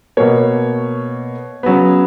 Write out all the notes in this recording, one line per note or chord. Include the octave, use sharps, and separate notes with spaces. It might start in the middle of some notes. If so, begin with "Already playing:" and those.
B2 A#3 C#5
C#3 F#3 B3